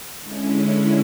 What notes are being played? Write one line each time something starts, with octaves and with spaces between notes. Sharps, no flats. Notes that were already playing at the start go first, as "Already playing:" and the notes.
D3 G#3 C#4 E4